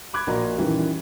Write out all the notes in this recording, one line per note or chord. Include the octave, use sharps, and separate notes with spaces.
B5 D6 F#6 G#6
A#1 A#2 F#4 A#4 D#5 A#5
F#2 D#3 E3 G3